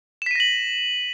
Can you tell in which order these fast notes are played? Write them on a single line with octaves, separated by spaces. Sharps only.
E7 B6 D#7 A#6 F#7